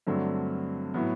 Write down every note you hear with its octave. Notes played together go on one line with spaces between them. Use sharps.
G2 D3 F#3 A3 C4
A2 F#3 B3